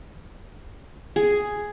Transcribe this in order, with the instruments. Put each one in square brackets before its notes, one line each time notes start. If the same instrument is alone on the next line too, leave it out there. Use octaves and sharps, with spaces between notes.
[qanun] G#4